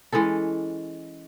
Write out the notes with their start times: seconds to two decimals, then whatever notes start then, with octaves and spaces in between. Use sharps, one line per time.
0.12 E3 G#3 C#4 A4